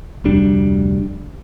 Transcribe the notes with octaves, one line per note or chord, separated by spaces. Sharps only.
F1 D2 G3 D4